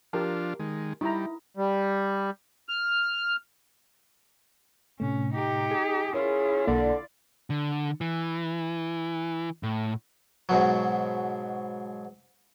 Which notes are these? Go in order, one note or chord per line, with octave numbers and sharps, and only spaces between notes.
F3 D4 F4 G4 A#4 A5
D#3 G#3
G3 D#4 E4 A#5
G3
F6
A2 C3 A3 C#4
D#4 G4
G#4
C#4 E4 F4 A#4
B1 D3 A#3 D5
D3
E3
A2
G#2 B2 F#3